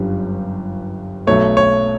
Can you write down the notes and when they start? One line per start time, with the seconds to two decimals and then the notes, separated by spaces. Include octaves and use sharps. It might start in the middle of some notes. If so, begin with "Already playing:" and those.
Already playing: G1 F#2 D3 G3
1.27 B1 B2 F#3 A3 C#5
1.57 C#5